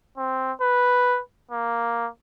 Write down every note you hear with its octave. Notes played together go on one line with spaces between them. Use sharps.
C4
B4
A#3